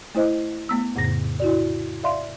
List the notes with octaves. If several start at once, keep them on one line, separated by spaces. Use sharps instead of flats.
A3 E4 C5 D#5
A3 B3 E6
F2 A2 C#3 A#6
E4 F#4 D5
D5 E5 F5 C6